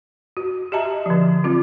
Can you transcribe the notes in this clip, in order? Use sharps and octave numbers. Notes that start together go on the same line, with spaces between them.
F#4
G4 D#5 E5 A5 A#5
D3 F3
F#3 C4 F4